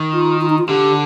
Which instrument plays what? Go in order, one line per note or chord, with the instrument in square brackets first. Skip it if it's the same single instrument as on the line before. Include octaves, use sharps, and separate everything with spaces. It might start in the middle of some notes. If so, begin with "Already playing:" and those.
Already playing: [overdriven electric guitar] D#3
[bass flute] F4
F4
D#4
F4
[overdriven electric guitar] D3 [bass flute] G4